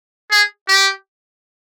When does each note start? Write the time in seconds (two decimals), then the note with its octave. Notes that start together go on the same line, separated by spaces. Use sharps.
0.31 G#4
0.68 G4